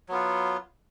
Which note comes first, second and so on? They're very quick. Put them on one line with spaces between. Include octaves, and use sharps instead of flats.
F#3 B3 F4